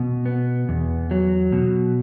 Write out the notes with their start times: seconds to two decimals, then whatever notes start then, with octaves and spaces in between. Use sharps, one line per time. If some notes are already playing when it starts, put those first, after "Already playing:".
Already playing: B2
0.26 B3
0.69 E2
1.11 F#3
1.52 B2